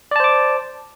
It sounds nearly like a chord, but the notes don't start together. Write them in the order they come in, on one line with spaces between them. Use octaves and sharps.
D5 A5 C5 D6